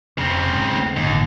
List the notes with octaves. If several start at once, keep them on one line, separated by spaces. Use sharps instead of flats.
F1 C#3 C4
G#2
D#2 A3
G1 D#2 A2 D3